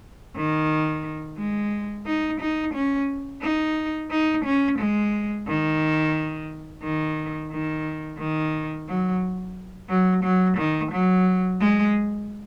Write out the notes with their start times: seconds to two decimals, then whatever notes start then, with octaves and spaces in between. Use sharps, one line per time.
0.36 D#3
1.37 G#3
2.06 D#4
2.40 D#4
2.74 C#4
3.42 D#4
4.11 D#4
4.45 C#4
4.78 G#3
5.47 D#3
6.83 D#3
7.52 D#3
8.19 D#3
8.88 F#3
9.89 F#3
10.23 F#3
10.57 D#3
10.92 F#3
11.60 G#3